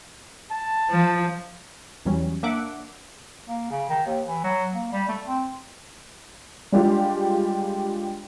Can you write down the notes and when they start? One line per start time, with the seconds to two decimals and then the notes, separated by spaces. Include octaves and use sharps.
0.51 A5
0.90 F3
2.05 E2 E3 F#3 G3 C#4
2.43 A#3 D4 E5 F#5 D6
3.48 A#3
3.70 C#3
3.89 D#3
4.06 D#2
4.27 E3
4.44 F#3
4.74 A#3
4.92 G3
5.08 A3
5.27 C4
6.72 G3 G#3 D4 F4 G4